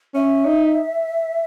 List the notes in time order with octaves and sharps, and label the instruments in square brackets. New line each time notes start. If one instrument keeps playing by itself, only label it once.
[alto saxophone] C#4 [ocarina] E5
[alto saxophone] D#4